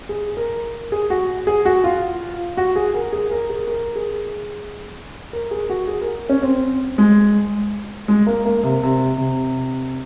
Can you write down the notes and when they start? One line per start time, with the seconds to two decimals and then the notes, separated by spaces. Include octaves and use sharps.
0.09 G#4
0.37 A#4
0.92 G#4
1.10 F#4
1.47 G#4
1.65 F#4
1.84 F4
2.57 F#4
2.76 G#4
2.94 A#4
3.13 G#4
3.31 A#4
3.50 G#4
3.68 A#4
3.96 G#4
5.33 A#4
5.51 G#4
5.70 F#4
5.87 G#4
6.01 A#4
6.29 C#4
6.43 C4
6.98 G#3
8.08 G#3
8.27 A#3
8.45 A#3
8.63 C3
8.83 C3
9.18 C3